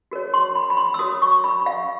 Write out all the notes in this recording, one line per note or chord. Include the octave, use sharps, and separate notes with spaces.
F#4 A#4 C#5
C6
B5
B5
C6
E6
F#4 A#4 C#5 D#6
C#6
B5
F5